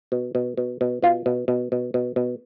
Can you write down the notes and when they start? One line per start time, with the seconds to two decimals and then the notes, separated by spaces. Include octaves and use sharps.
0.12 B2
0.35 B2
0.57 B2
0.81 B2
1.02 B2 F4
1.26 B2
1.48 B2
1.72 B2
1.94 B2
2.16 B2